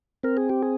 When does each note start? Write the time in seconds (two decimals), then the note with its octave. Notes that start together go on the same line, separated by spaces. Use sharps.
0.23 C4 A#4
0.37 G#4
0.49 G4
0.62 G#4